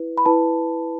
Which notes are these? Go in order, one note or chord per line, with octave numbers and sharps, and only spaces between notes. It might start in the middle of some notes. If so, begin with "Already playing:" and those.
Already playing: E4 B4
B5
E4 B4 A5